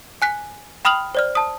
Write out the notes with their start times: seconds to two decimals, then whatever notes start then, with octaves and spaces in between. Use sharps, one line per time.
0.22 G#5 F#6 B6
0.85 G5 B5 D#6 F6 F7 F#7
1.15 C5 D5 F6
1.35 A5 D#6